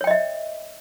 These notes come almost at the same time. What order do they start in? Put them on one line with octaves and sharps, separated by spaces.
C#5 G5 D#5 E5